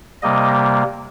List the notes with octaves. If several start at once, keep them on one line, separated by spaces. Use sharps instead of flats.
C3 G3 A#3 D#5